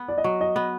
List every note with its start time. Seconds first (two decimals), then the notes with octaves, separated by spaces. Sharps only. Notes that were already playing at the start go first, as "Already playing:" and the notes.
Already playing: B3
0.08 D5
0.18 D#5
0.24 F#3
0.41 D#5
0.56 B3